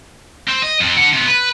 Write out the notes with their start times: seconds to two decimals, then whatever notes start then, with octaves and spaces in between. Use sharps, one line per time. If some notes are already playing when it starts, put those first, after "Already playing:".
0.49 C4
0.63 D#5
0.80 F2 C4
0.96 D3 F#5
1.13 C3 B3
1.28 B4